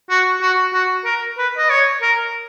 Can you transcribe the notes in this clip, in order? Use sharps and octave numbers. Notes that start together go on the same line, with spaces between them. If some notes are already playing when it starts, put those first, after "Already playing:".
F#4
F#4
F#4
A#4
B4
D#5
C#5
A#4